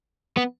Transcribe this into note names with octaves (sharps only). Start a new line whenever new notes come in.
B3